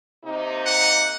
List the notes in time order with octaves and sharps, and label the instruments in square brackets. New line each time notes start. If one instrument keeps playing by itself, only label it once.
[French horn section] C3 A#3 D#4
[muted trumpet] F#5